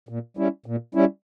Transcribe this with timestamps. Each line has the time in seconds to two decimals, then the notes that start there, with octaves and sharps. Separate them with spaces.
0.09 A#2
0.37 G3 C#4 E4
0.66 A#2
0.95 G3 C#4 E4